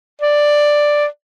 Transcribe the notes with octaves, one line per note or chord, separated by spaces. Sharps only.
D5